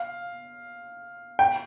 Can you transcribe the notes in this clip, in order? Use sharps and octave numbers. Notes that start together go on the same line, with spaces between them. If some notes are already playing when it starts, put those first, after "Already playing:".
Already playing: F5
G5